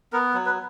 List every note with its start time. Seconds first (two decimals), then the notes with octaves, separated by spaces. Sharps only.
0.13 B3 A#4
0.34 F#3
0.46 B4